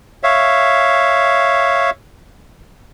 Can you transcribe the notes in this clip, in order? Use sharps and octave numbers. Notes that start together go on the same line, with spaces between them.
C#5 E5 F5